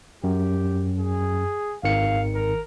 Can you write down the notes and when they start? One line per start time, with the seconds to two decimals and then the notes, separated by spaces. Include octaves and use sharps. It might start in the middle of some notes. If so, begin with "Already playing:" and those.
0.24 F#2 G4
0.99 G#4
1.84 G#1 D#3 F5 C#7
2.34 A#4